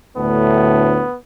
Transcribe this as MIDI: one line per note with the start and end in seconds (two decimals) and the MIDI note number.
0.17 1.03 38
0.17 1.03 45
0.17 1.17 59